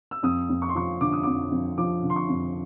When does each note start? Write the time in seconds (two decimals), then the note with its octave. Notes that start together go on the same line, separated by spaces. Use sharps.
0.11 E6
0.23 F2 D#6
0.49 F2
0.62 C#6
0.69 C6
0.75 F3 C#6
1.01 D3 D6
1.12 D#6
1.23 F2 D6
1.51 F2
1.78 F3 D6
2.03 D3
2.10 C6
2.16 C#6
2.29 F2